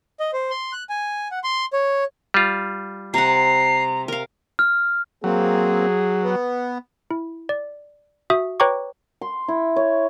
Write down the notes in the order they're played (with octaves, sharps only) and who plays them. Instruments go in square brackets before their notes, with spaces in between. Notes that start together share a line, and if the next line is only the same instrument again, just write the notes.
[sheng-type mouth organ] D#5
C5
C6
F#6
G#5
F#5
C6
C#5
[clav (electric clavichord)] G3 F4
[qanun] C3 F#5 [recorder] A#5 [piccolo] C7
[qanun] A#4 F5
[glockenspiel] F6
[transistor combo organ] F#3 [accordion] A#3 C4 [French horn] G#4
[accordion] B3
[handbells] E4
D5
F#4 E5 D#6
B4 C#5 G5 A#5 C#6 D6
[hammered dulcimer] C6
E4
C#5